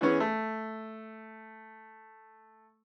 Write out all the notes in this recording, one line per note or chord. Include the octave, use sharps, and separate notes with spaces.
E3 B3 C#4 G#4
A3